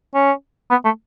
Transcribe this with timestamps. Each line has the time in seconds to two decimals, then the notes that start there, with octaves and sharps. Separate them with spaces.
0.15 C#4
0.71 B3
0.85 A3